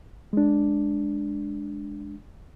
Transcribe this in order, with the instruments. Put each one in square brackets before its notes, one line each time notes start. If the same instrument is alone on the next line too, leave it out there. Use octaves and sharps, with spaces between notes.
[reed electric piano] G#3 D4